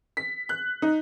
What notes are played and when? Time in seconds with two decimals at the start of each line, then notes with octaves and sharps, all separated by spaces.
0.17 B6
0.49 F#6
0.82 D#4